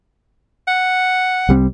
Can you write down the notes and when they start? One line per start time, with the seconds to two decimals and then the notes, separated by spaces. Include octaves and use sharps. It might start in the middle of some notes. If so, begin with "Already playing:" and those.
0.67 F#5
1.49 C2 G3 C4